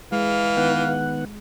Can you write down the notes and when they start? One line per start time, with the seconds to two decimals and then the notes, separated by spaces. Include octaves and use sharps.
0.12 E3 G#3 F5
0.57 D#3 B3 F#5